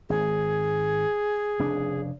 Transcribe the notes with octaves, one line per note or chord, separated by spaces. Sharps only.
G#1 G#4
F1 C#3 D4